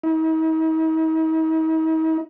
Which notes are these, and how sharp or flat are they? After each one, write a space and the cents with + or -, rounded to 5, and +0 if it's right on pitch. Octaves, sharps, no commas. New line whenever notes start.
D#4 +45